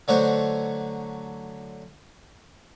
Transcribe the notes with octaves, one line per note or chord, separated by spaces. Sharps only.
D3 F#3 A3 F#4 C5